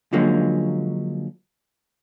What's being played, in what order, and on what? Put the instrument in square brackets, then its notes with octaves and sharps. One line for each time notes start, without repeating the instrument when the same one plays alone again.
[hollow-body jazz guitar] D3 F3 F#3 G#3 A#3 C#4